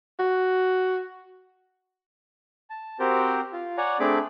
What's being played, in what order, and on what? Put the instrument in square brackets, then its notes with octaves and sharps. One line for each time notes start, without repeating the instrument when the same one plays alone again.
[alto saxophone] F#4
[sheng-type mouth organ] A5
C4 F#4 G4 A#4 C5
F4
C#5 D5 F#5 G#5 A#5
A3 C4 D4 G#4 B5 D6